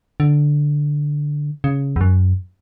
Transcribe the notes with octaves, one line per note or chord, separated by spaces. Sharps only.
D3
C#3
E2
F#2